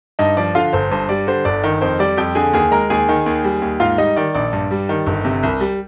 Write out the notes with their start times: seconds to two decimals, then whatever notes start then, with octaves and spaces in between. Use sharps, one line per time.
0.19 G2 D#4 D#5
0.37 F3 D5
0.55 D3 F4 F5
0.73 G1 C5
0.91 G2 C5
1.09 G3 D5
1.27 D3 C5
1.45 G1 D5
1.64 D#3
1.81 F2 C5
1.99 G3 D5
2.17 F2 G4 G5
2.35 D3 G#4 G#5
2.53 D#2 G#4 G#5
2.72 G#3 A#4 A#5
2.90 D#2 G#4 G#5
3.09 D#3
3.26 D#2
3.44 G3
3.62 D#2
3.80 G#2 F4 F5
3.98 G3 D#4 D#5
4.16 D#3 D5
4.35 A#1 D5
4.53 G2
4.71 G3
4.89 D#3
5.06 G1
5.25 C3
5.43 C2
5.60 G3